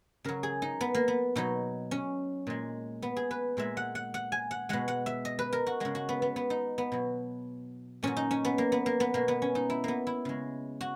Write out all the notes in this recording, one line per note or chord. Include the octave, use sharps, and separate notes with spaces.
C#3 F#3 A#4
G#4
D#4
B3
A#3
B3
B2 F#3 D#4
C#4
A#2 G#3
B3
G#4
B4
A#2 G#3 E5
F#5
F#5
F#5
G#5
F#5
B2 G#3 F#5
F#5
E5
D#5
B4
A#4
F#4
C#3 G#3 F#4
F#4
B3
B3
B3
D#4
B3
B2 F#3
A#2 F#3 C#4
D#4
C#4
B3
A#3
B3
A#3
B3
B2 G#3 A#3
B3
C#4
D#4
E4
A#3 B3
E4
C#3 G#3
F#4